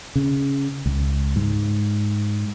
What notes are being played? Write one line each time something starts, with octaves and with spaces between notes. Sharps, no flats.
C#3
C#2
G#2